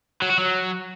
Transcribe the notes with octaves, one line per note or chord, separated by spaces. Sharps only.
F#3
F#4
F#3